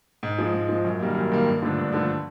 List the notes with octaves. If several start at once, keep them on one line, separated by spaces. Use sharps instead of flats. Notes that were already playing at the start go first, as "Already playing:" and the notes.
G#2
F3 G#3
G#2
F3 G#3
F#2
D#3 G3 A#3
F#2
D#3 G3 A#3
G2
D3 F3 A3 D4
G2
D3 F3 A3 D4